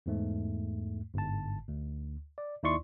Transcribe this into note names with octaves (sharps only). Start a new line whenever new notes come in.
E2 G#2 A3
G1 G#2 A5
D2
D5
D#2 D#4 E4 D5 C6 C#6